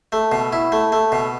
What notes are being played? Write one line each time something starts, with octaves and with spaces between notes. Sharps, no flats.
A3
B2
E4
A3
A3
B2